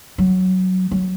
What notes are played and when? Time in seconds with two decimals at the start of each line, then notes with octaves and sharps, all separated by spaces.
0.18 F#3
0.91 F#3